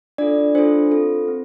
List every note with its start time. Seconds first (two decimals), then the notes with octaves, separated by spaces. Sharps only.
0.18 D4 F4 A4 D5
0.55 D4 F4 A4 C5
0.92 C4 F4 A4
1.28 C4